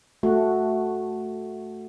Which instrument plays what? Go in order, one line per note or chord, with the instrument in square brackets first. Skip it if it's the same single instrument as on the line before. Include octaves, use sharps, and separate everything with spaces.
[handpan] A3 F#4